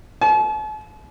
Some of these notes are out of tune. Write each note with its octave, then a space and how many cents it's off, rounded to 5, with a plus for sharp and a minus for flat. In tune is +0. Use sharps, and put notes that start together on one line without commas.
A5 -45